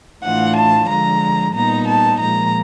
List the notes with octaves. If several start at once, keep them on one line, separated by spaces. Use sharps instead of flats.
A2 E3 A3 D4 F4 F#5
A5
D3 F3 G#3 A#5
A#2 G3 B3 D#4 A#5
A5
A#2 F3 G#3 A#5